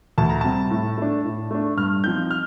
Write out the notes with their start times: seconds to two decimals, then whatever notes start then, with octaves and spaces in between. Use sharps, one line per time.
0.18 D2 A5
0.30 A#5
0.41 C3 G3 C4 A5
0.71 A2
0.98 A3 D4
1.25 A2
1.51 A3 D4
1.77 G2 F6
2.04 F3 C4 D#4 G6
2.31 F6